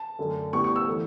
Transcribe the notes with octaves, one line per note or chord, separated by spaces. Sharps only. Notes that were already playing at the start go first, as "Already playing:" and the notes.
Already playing: A5
F#2 D3 A3
A2 G3 B3 C#6
C#6
E6
E3 A3